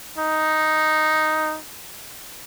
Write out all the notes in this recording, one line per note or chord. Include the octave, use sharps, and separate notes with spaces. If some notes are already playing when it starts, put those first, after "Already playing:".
D#4